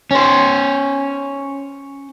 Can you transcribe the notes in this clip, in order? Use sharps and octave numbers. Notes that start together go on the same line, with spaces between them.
C#4 C5